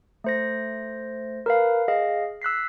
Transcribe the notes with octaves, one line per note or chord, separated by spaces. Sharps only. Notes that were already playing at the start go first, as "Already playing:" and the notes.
A3 C5 A#6
A#4 B4 F5
G#4 D#5 F5
E6 F#6 B6 C7